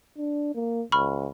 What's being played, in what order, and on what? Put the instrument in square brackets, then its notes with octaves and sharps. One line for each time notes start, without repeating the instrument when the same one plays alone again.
[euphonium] D4
A#3
[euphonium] C#2 [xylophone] B5 C#6 F6